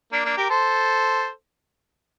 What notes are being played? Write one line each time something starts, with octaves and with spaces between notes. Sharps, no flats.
A#3 D4
A#3 D4
G4 A#4
A4 C5